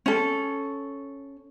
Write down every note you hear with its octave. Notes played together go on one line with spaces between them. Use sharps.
C#4 A4